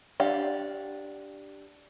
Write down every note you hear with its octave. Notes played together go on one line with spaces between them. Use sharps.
D4 G4 F5 F#5